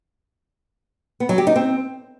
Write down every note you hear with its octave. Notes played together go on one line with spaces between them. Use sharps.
B3
F#3
G4
D#4
C4